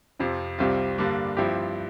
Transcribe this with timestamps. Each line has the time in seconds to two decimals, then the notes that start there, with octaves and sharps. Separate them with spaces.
0.20 F2 C3 F3
0.59 C2 C3 G3 C4 F4
0.98 G2 D3 G3 A#3 D4
1.37 G2 F3 C4 E4 G4